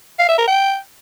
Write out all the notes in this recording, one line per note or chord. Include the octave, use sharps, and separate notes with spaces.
F5
E5
A#4
G5